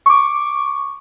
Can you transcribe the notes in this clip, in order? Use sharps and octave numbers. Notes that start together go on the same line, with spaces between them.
C#6 D6